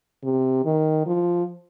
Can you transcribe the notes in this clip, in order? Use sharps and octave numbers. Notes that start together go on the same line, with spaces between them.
C3
D#3
F3